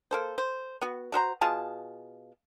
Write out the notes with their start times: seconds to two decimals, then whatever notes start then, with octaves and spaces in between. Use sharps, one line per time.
0.11 A#3 A4 C5
0.38 C5
0.81 B3 F#4
1.12 A3 F#4 C5 A#5
1.41 B2 F4 G#4 A5